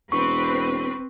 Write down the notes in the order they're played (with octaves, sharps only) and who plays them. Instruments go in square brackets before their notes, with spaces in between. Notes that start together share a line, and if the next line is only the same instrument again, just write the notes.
[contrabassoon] E1 [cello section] C4 B4 [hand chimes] C#6